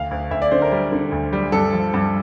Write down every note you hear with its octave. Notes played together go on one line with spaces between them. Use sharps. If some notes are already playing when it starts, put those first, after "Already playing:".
Already playing: D2 F5
D2
D2 E5
D5
D3 C5
A#4
G3
D3
D2
G3
G2 A4
F3
G2